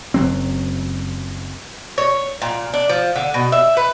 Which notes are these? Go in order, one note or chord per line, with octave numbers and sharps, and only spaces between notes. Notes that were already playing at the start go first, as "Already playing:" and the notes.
F#1 F#3 C4
C#5
A#2
D4
F3
D3
B2
E5
B4